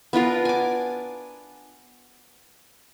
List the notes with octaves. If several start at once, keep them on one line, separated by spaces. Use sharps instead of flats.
B3 D4 F4 A#4
G#5 D6